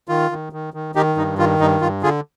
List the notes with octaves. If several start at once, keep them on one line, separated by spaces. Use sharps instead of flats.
D#3 F4
D#3
D#3
D#3
D#3 D#4 G4
G2 D#4
D#3 F4
G2 D#4
G2 F4
D3 F4 G#4